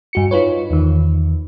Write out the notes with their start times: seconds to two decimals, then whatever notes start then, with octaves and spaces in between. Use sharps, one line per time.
0.13 G2 F#4 C#7
0.31 D#4 F4 B4 C#5
0.70 E2 D#3